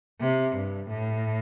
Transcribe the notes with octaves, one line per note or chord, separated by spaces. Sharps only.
C3
G2
A2